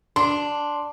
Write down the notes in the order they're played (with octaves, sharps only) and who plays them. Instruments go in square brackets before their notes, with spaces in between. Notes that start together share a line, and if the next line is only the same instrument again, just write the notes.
[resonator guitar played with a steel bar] D4 [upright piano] C6